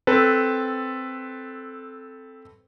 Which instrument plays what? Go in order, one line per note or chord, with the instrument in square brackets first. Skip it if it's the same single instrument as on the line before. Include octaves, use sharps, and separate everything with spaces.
[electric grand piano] C4 A4 B4